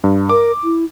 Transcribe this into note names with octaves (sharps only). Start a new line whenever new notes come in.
G2
A#4 D6
E4